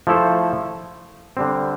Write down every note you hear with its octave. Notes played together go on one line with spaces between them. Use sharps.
F3 A3 E4 A4 C5
D3 G3 C4